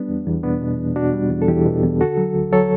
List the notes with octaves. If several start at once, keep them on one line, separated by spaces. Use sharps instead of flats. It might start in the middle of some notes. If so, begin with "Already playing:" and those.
Already playing: G3 B3 D4
E2
E2
B2 B3 D4
B2
E2
B2 D4 F#4
G3
E2
A4
E2 E4 G4
B2
E2
D3 F#4 A4
F#3
D2
F#3 A4 C#5